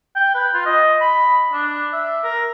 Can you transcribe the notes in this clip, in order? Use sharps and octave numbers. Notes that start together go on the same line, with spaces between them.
G5
B4
F4
D#5
B5
D4
E5
A#4